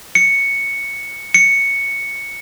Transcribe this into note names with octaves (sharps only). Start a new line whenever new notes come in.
C#7
C#7